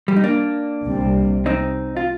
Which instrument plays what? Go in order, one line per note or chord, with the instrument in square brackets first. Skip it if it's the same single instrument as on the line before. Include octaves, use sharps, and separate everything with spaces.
[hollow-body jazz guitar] G3
D#4
A#3 D4
[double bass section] C2 C3 G3 C4
[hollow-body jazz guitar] C4 D#4
F4